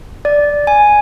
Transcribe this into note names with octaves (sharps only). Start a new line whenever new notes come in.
D5
G#5